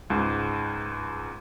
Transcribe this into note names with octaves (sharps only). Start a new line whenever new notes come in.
C#2 G#2